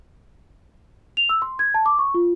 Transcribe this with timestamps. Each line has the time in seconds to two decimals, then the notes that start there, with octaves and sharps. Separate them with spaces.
1.17 F7
1.29 E6
1.42 C6
1.59 G#6
1.74 A5
1.86 D6
1.99 C#6
2.14 F4